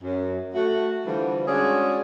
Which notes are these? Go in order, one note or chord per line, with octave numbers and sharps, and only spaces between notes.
F#2
A3 F#4
D3 E3 F3 G3
G#3 C#4 D4 F#4 G#4